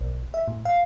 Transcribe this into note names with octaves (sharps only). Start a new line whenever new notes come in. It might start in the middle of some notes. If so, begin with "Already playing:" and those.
B1
E5
A2
F5